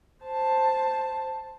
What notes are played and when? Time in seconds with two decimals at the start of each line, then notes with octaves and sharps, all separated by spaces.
0.25 C5 A5